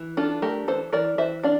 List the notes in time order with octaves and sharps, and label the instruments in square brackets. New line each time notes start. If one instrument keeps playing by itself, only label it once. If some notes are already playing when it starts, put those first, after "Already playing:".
Already playing: [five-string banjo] E3
D4 F4 A4
A3 G4 A#4
E3 A4 C5
E3 A#4 D5
E3 C5 E5
D4 D5 F5